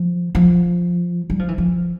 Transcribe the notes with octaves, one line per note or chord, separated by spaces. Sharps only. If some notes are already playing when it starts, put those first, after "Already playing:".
Already playing: F3
F3
G3
F3
E3
F3